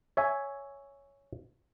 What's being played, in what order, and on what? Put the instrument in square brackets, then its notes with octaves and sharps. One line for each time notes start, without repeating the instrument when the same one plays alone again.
[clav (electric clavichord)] C#5 E5 G#5